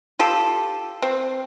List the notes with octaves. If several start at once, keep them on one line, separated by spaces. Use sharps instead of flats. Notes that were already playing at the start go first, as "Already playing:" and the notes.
F4 G4 A4
C4